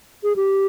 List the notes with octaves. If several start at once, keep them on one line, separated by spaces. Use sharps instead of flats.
G#4
G4